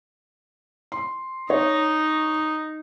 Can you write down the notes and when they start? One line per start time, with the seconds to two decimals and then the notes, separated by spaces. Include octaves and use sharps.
0.92 C6
1.50 D#4 C#5